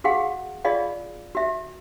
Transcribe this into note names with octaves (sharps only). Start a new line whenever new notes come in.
F#4 G#4 F5 F#5
F4 G#4 D5 D#5 F5
F#4 E5